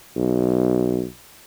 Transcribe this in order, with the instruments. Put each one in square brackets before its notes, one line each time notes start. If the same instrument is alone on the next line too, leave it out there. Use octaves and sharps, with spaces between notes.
[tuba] B1